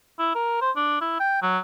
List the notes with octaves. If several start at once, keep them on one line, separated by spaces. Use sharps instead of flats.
E4
A#4
C5
D4
E4
G5
F#3